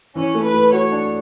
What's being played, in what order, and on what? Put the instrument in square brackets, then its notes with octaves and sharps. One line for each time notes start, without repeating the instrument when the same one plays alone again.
[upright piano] E3 [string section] C#4
[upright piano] A3
[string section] B4
[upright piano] A3
[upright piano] F#4 [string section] C#5
[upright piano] D4